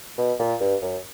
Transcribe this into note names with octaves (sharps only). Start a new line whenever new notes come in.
B2
A#2
G2
F#2